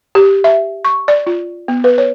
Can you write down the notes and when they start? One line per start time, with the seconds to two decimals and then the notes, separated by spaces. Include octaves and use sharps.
0.15 G4
0.44 E5
0.85 C#6
1.08 D5
1.27 F4
1.68 B3
1.84 B4
1.98 C#5